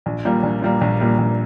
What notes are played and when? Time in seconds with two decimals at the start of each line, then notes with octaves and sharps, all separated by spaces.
0.06 A#1
0.25 A#2 G3 A#3
0.43 A#1
0.62 A#2 G3 A#3
0.81 A#1
1.00 A#2 G3 A#3
1.18 A#1